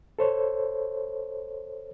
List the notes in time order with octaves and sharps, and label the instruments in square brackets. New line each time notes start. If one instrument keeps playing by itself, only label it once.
[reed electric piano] A4 C5 C#5